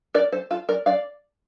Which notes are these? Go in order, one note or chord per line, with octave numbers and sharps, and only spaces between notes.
A#4 D5
A4 C5
F4 A4
A#4 D5
D5 F5